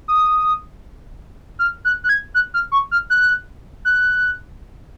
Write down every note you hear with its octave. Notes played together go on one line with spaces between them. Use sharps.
D#6
F6
F#6
F#6
G#6
F#6
F6
C#6
F6
F#6
F#6